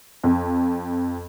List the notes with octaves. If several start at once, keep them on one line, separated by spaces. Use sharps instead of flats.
F2